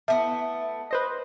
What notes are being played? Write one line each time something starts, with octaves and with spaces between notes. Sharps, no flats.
A3 B3 E4 E5
B4 C5 D#5